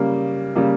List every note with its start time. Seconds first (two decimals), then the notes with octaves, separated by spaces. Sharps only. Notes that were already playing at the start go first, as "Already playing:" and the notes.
Already playing: C#3 G3 A#3
0.56 C#3 G3 A#3